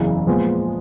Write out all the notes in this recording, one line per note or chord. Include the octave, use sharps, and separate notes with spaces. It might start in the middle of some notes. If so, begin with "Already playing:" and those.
Already playing: F#1 E2 C#3 E3
A#2 F3 G#3 B3